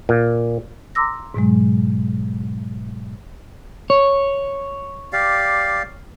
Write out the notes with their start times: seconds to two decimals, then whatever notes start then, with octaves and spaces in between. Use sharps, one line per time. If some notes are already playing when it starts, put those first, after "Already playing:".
0.09 A#2
0.95 A#5 C6 D6 E6 A#6
1.34 G#2 B2 F#3 G#3
3.90 C#5
5.13 G4 D5 F5